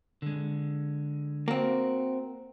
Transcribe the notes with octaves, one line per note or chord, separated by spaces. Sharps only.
D3 G#3
A#3 C4 F#4